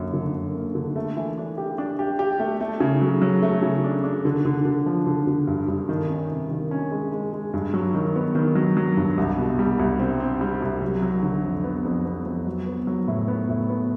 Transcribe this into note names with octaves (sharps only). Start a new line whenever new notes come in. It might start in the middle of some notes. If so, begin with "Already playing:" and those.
Already playing: F#2 D3 A#3
D3
F#2
A#3
D3
A3
E3
D4
G4
D4
G4
G4
A3
A3
C#3
F#3
F#3
A3
C#3
D4
D4
D3
D3
D3
F3
D3
D3
G2
G2
D#3
C#4
C3
D#3
C#4
G#3
G#3
G#3
G2
F#3
D#3
B3
D#3
F#3
F#3
G2
C2
B2
G3
C2
C4
C4
G3
C2
F#3
F#3
D3
F2
B3
F2
B3
F2
F#3
B3
F#3
A2
B3
A2
B3